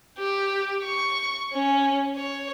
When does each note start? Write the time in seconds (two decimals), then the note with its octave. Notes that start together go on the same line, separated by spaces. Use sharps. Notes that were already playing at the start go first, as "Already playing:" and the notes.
0.18 G4
0.84 C#6
1.53 C#4
2.16 C#5